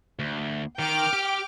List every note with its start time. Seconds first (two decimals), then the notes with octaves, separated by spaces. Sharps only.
0.19 D2
0.79 D#3 G5 D6 F6
1.13 G4